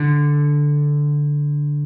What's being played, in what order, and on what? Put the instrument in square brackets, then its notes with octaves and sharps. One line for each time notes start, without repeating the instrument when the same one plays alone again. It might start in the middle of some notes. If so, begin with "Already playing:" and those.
Already playing: [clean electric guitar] D3